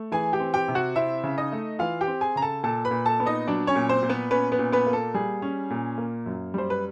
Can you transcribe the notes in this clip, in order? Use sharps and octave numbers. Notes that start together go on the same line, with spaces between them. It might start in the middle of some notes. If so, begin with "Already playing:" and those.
Already playing: A3
E3 G#4 G#5
G4 G5
C4
G4 G5
C3
F#4 F#5
C4 E4 E5
C#3
D#4 D#5
A3
E3 F4 F5
G4 G5
C4
G#4 G#5
C#3 A#5
A4 A5
A#2 A4 A5
B4 B5
A#2
A4 A5
B3
D#4 D#5
F#3 D4 D5
C#4 C#5
A#2
C4 C5
A#2
B3 B4
B3 C#4 B4
B3 B4
A#2
B3 B4
A#3
A4
G3 G#4
C#4
A#2
A#3
F#2
G3 C5
B4